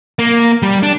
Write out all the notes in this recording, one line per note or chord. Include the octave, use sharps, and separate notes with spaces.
A#3
G3
D4